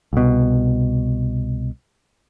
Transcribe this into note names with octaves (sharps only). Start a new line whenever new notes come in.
C2 B2